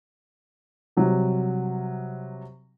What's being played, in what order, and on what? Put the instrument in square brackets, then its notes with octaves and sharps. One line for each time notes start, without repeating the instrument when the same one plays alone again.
[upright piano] C3 F#3 G3